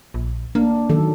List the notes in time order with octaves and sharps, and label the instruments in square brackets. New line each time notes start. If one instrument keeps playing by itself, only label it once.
[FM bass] A#1
[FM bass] A#3 [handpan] D4
[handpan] D#3 F#3 A4